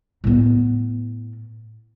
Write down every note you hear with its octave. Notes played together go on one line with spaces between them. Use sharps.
A2 B3